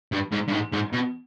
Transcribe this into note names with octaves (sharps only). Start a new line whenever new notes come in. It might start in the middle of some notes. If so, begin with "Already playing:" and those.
G2
G#2
G2
G#2
G#2
B2